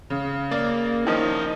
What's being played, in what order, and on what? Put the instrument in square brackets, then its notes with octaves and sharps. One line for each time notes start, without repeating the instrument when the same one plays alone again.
[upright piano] C#3
[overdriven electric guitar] A#3 [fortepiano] D5
[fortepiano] D#3 F3 [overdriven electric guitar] E4 D#5